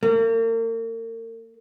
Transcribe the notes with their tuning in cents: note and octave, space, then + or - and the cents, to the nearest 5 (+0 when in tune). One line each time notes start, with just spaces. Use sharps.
A#3 -40